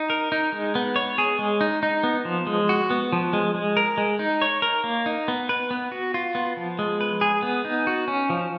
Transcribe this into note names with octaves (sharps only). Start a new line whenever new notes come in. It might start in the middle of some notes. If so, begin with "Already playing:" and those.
Already playing: D#4
A#4
D#4
G#3
B3
C#5
G#4
G#3
D#4
D#4
B3
F3
G#3
F#4
B3
F3
G#3
G#3
A#4
G#3
D#4
C#5
A#4
A#3
D#4
B3
B4
B3
F#4
F4
B3
F3
G#3
B4
G#4
B3
D#4
F#4
C#4
F3